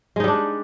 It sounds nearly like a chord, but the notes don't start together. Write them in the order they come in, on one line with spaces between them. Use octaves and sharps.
G#3 D#4 G3 D4